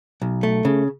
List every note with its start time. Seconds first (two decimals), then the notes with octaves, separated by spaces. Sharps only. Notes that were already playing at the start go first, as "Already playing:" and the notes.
0.22 B1
0.43 A3
0.65 C#3